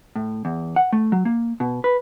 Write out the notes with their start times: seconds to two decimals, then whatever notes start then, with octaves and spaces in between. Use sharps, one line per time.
0.15 A2
0.45 E2
0.76 F#5
0.93 A3
1.12 F#3
1.25 A#3
1.60 B2
1.84 B4